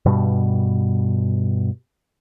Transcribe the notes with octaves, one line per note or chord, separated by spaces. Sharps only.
G2 B2 G3